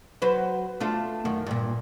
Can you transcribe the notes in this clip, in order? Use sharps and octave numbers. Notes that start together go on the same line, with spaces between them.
F#3 B4 C5
A3 D4 F4
F#2 D#3
G2 A#2